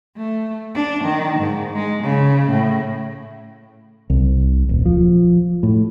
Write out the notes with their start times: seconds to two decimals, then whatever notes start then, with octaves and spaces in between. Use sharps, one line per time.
0.17 A3
0.75 D4
1.04 D#3
1.39 G#2
1.75 G#3
2.04 C#3
2.50 A2
4.10 C2
4.69 D#1
4.86 F3
5.63 A2